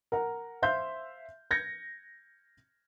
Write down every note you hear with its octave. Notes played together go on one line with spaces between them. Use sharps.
A#4 F#5 A#5
C5 E5 F5 C6 G6
G6 G#6 A#6 C#7